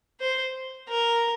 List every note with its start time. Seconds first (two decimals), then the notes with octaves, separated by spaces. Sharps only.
0.20 C5
0.89 A#4